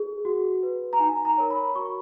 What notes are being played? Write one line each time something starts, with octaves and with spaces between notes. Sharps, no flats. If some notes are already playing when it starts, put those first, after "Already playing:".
Already playing: G#4
F#4
B4
A#5
D#4 G#5
A#5
A#4 C#5
B5
F#4 C#6